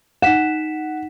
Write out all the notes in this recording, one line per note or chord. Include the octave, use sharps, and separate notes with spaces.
D#4 F#5 B6 E7